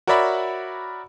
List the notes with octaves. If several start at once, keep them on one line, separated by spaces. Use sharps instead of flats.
F#4 A#4 C#5 D5 E5 B5